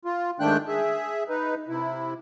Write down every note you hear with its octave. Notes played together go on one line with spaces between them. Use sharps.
F4
G#2 D#3 A3 D4 G5 F#6
G#4 E5
D#4 B4
C3 E4